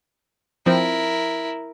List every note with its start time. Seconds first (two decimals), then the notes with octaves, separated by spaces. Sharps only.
0.66 F3 C4 E4 A#4 C5